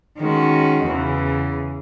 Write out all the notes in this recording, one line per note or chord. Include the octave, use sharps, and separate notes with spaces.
D#3 G#3 C#4 F#4
E2 C#3 E3